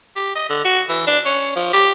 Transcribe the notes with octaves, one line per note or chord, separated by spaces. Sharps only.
G4
D#5
D3
F#4
E3
D4
C#4
F3
G4